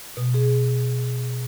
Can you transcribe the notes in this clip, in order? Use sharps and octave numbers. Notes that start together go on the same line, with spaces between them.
B2
G#4